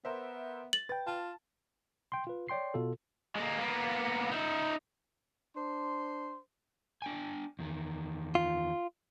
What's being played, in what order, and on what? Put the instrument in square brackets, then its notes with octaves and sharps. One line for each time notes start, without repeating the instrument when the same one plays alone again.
[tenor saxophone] B3 [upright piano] A#4 C5 E5
[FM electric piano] A6 [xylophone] F#7
[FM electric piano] B4 G5 [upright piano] A6
[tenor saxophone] F4 [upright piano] A5
[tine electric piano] G5 C6
F4 B4
C#5 D5 G5 C6 C7
B2 F4 A4
[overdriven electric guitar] G#3 A#3
A#3 B3
D#4 E5
[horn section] D4 C5 C6
[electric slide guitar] D4 G5 G#5
E2 D#3
[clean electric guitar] F4